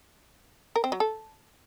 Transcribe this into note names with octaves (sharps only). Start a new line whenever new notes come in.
A#4
C4
F#3
A4